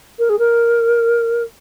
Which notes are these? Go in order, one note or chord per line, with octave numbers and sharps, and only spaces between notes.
A#4
G#4
A#4